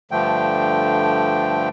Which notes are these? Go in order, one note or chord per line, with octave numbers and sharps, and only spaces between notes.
G2 D3 F3 A3 G5